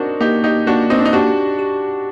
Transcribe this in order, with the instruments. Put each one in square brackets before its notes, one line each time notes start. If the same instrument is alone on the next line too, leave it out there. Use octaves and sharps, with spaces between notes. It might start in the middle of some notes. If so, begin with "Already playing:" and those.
Already playing: [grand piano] C4 D4 D#4 F#4 [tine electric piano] A#4
[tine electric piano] A#3 [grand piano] D#4 G4
[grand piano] D#4 G4
[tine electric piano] A#3 [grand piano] D4 F#4
[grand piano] C4 D#4
D4
D#4
[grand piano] D4 F#4 [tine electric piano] G4
[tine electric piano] G4